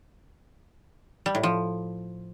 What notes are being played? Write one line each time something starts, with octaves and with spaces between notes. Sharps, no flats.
G3
A2
F3